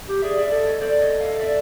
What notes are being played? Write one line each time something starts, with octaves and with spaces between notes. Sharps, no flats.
G4
G#4 D5 E5
D5 E5
A4 D5 E5
C#5 D#5
A4 C5 D5
C#5 D#5
D#5 F5
D#5
D5 E5